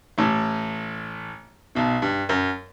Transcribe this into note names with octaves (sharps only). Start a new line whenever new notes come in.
A1 A2
B1 B2
G2
F#2